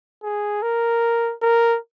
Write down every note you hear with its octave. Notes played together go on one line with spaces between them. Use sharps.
G#4
A#4
A#4